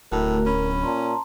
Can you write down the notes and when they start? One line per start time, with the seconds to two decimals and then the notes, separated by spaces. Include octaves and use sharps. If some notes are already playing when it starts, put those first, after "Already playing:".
0.12 D1 A2 A3 F#4 A#4
0.46 C#4 B5
0.83 A#2 A5 A#5 C6